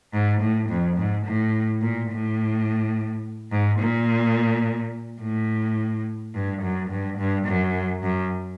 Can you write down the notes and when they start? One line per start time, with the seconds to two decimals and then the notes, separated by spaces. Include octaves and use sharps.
0.13 G#2
0.41 A2
0.69 F2
0.97 G#2
1.26 A2
1.82 A#2
2.11 A2
3.51 G#2
3.79 A#2
5.21 A2
6.35 G2
6.62 F#2
6.90 G2
7.18 G2
7.46 F#2
8.03 F#2